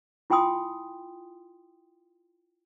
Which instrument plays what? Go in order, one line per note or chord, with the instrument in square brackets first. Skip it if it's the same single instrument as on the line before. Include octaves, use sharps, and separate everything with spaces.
[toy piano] E4 F4 G5 G#5 C6 D#6